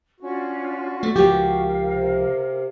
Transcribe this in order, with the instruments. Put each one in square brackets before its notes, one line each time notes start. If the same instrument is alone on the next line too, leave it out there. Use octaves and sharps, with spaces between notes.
[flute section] C#4 D4 F4 [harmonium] F#4
[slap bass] A3
[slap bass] C#2 F3 [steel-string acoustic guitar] G4 [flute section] A#4 F5
[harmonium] C3